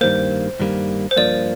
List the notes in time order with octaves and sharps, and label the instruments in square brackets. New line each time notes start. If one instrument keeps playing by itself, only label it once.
[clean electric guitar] G2 D#3 G3 A#3 [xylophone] C5
[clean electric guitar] G2 D#3 G3 A#3
[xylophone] C5
[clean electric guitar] G2 F3 A#3 [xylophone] D5